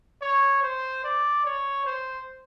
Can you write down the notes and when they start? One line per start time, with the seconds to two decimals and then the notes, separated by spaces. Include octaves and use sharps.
0.22 C#5
0.63 C5
1.04 D5
1.45 C#5
1.86 C5